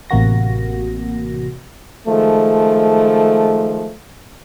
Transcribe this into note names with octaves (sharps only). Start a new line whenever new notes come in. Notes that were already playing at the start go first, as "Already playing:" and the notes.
A1 C3 A#3 F#4 A#6
D#3 F3 G#3 A3